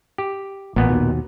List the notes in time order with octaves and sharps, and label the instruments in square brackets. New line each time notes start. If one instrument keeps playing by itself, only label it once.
[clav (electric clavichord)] G4
[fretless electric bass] A1 [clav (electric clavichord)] A#2 B3
[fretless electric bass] D#2 B2